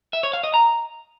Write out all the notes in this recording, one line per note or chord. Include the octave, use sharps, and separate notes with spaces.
E5
C#5
F5
D#5
A#5